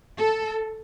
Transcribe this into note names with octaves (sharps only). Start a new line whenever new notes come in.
A4